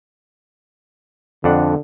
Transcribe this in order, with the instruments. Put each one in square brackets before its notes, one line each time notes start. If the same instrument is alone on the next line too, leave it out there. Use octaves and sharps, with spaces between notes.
[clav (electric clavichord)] F2 D4 F#5 [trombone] D3